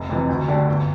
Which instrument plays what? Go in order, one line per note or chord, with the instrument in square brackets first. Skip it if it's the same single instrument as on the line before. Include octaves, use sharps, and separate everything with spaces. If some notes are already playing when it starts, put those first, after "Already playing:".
Already playing: [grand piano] F1
F2 C3 E3
D2
D3 A3 D4 G4
G1